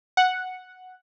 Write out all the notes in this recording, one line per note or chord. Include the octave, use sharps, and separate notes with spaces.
F#5